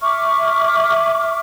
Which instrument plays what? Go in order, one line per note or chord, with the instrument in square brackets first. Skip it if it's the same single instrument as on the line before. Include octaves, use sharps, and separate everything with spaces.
[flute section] E5 C#6 D6 F6